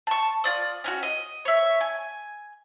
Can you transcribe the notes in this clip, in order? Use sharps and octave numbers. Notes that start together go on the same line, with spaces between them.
A5 C#6
F4 D5 D#6
C#4 D#4 F#4
D#5
C#5 E5
G#5